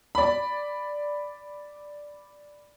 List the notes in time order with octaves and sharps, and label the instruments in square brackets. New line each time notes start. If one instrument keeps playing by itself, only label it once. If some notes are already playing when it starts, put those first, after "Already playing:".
[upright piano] D5 B5